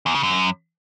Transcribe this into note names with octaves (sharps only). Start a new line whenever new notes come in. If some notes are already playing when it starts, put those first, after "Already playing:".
E2
C#3
F#2